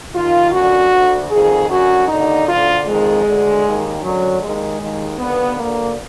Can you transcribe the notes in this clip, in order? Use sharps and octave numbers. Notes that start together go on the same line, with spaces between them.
D#2 D#3 F4
F#2 D3 F#4
D2 D3
F2 D#3 G#4
F#2 D3 F#4
D#2 D3 D#4
D2 D3 F4
F2 D#3 G#3
D2 D3
D#2 D#3
F#2 D3 F#3
D#2 D#3 G#3
D#2 D#3
D#2 D3 B3
D2 D3 A#3